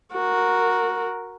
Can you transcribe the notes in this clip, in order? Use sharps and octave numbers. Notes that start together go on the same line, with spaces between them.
F#4 A#4